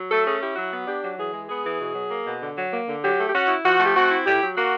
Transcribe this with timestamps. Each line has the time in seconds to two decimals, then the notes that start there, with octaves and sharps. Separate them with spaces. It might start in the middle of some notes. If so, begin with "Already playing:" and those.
Already playing: F#3
0.09 A3 A4
0.24 C#4 G#4
0.39 E4 G4
0.55 F#3 F#4
0.70 B3
0.86 D4 G4
1.01 F#3
1.16 E3 G#4
1.32 G#3
1.47 B3 G#4
1.63 E3
1.79 B2
1.94 F#3
2.10 A#3
2.25 B2
2.40 D3
2.55 F#3
2.71 A#3
2.87 D3
3.01 F#3 G4
3.17 A3
3.27 G4
3.33 C#4 F#4
3.48 E4
3.63 F3 F#4
3.79 A3 G4
3.94 C4 F#4
4.10 E4
4.25 A2 G4
4.40 F#3
4.56 A#3 F#4